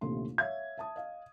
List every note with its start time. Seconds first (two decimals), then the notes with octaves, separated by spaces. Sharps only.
0.01 A#1 D#2 C3 A3 A4 C6
0.38 C#5 E5 F5 G#6
0.78 E5 A5 D#6
0.96 D#5 F5